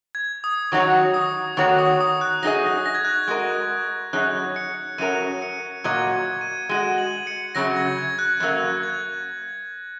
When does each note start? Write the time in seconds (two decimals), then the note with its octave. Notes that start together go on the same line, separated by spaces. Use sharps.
0.15 G#6
0.44 D#6
0.72 D#3 F#3 D#4 F#4 C#5 C#6
1.14 D#6
1.57 D#3 A#3 F#4 C#5 C#6
1.79 D#6
2.01 D#6
2.21 F#6
2.43 F#3 D#4 G#4 D#5 A#6
2.86 A#6
2.95 G#6
3.05 F#6
3.14 G#6
3.27 G#3 F#4 A#4 D#5
4.13 F#2 F#3 D#4 G#4 C#5 F#6
4.56 C#7
4.98 F#2 F#3 C#4 F#4 A#4 D#7
5.42 C#7
5.84 A#2 F#3 A#3 F#4 D#5 G#6
6.41 D#7
6.69 G#3 F#4 D#5 D#7
6.98 F#7
7.27 C#7
7.55 F#2 C#3 F#3 A#6
7.76 G#6
7.98 G#6
8.19 F#6
8.40 F#2 F#3 A#3 F#6
8.83 G#6